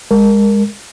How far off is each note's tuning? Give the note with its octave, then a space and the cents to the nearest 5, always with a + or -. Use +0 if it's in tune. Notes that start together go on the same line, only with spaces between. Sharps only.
G#3 -20 A#4 +0